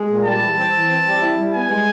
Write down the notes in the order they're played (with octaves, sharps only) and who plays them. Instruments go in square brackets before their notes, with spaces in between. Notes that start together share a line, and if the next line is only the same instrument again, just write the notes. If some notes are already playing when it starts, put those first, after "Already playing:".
Already playing: [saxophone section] G#3
A#2
[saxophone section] G3 [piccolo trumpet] A5
[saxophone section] E3
C4
E3
C4
G3
E4
G3
[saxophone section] B3 [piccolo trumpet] G#5
[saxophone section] G#3